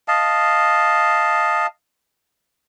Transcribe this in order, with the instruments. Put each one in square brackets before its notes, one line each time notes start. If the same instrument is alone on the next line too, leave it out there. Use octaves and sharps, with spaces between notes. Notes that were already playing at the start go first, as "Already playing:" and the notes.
[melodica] D#5 F5 A5